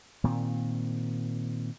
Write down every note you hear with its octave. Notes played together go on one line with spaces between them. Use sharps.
A#2 D#3 C4